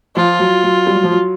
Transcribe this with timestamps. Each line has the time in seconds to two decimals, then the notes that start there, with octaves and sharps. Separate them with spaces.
0.16 F3 F4
0.39 F#3
0.64 F#3
0.87 G3
0.95 F#3
1.04 F3
1.11 F#3